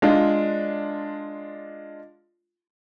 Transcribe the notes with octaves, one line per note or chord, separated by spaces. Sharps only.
G#3 D4 F4